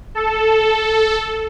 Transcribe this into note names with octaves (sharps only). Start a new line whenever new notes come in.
A4